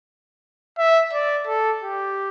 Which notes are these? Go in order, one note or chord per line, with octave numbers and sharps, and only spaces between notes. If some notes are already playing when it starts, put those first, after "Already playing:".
E5
D5
A4
G4